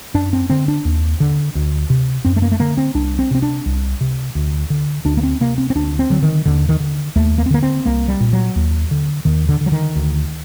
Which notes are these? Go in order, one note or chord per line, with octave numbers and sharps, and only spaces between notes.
F#2 D4
C4
D3 C4
D4
D#2
D3
D2
C3
F#2 C4
A3
A#3
A3
D3 A#3
C4
C2 D4
C4
C3 C4
D4
C2
C3
D2
D3
D2 D4
A#3
C4
C3 A#3
C4
C4
D2 D4
C4
D3 F#3
D#3
D#2 D3
D#3
D3
D#2 A3
A#3
C4
D3 A#3
C4
C2 A#3
G3
A#2
F#3
D#2
D3
D#2 D#3
D3
D3
F#3
D#3
D2